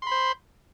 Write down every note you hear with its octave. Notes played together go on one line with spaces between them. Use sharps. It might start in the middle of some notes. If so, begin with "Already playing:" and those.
C5 B5 C6